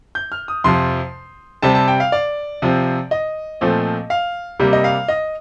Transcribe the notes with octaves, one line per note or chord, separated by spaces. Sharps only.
G6
F6
D#6
F2 C3 F3 C6
C3 G3 C4 A5
A5
G5
F5
D5
C3 F3 C4
D#5
A#2 F3 A3 C4
F5
C3 G3 A#3
D#5
F5
D#5